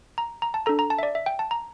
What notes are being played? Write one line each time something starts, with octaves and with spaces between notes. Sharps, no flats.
A#5
A#5
A5
D4 A4 A#5
A#5
A5
E5
D5
E5
G5
A5
A#5